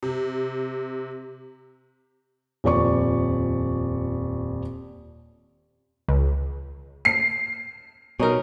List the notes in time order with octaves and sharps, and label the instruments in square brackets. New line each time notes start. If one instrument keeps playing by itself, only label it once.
[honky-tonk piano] C3
[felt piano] D#1 F2 D5 C#6
[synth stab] C#2
[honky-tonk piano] C7
[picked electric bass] B2 [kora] C#4 D#4 A#4